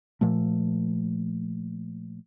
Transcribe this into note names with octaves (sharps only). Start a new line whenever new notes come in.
A#2 F3 A3